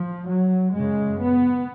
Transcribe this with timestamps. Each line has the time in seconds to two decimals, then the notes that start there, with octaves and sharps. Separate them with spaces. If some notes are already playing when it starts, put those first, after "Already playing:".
Already playing: F3
0.29 F#3
0.74 F#2 C#3 G#3
1.21 B3